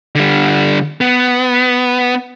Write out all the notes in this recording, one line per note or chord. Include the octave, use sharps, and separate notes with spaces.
D3 G3
B3